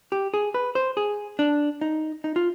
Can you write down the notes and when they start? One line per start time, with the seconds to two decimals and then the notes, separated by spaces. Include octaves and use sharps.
0.12 G4
0.34 G#4
0.54 B4
0.75 C5
0.97 G#4
1.39 D4
1.81 D#4
2.24 D#4
2.36 F4